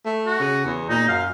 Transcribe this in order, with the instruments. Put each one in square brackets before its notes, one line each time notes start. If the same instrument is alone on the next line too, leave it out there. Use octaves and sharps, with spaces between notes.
[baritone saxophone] A3
[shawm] F#4
[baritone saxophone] C#3
E2
[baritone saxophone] A#2 [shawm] D#4
[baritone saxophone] F#2 [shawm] F5